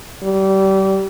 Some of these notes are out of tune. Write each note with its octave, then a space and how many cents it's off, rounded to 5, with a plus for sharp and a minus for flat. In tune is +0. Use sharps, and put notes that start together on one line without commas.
G3 -30